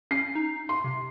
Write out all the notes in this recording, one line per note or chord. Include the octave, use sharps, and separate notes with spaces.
C#4 C7
D#4
C6
C3